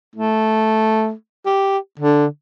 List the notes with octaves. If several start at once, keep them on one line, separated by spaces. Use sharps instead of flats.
A3
G4
D3